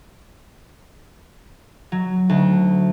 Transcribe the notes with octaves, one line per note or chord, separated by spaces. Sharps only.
F#3
D2